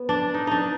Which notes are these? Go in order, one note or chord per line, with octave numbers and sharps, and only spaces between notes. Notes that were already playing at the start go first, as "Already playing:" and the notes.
Already playing: B3
D4
D#4
D4 D#4